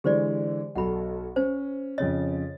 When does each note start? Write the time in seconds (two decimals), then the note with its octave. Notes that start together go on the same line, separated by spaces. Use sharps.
0.04 D3 E3 G#3 G4 C5 D5
0.75 B1 F#4 A4 F#5 B5
1.36 C#4 C5
1.98 F2 C#3 C#5 D#5 A6